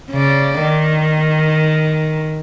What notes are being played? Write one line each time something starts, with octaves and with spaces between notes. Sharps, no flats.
C#3 D5
D#3